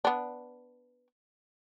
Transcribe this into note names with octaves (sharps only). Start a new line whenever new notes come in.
B3 D4